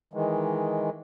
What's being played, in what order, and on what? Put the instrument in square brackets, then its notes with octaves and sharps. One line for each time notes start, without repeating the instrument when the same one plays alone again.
[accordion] D#3 E3 G#3